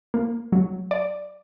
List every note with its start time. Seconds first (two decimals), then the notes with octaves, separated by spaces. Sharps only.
0.14 A#3
0.52 F#3
0.91 D5